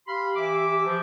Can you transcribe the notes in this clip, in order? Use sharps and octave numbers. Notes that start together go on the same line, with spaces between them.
G4 F5 B5 C6
E3 E5 D6
F3